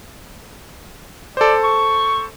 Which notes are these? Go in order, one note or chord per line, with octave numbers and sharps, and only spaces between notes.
A4 C5 D5
C#6